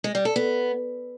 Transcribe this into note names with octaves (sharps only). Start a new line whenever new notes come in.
G#3
G3
A4
B3